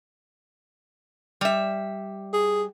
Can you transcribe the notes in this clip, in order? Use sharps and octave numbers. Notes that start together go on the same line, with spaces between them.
G3 E5
G#4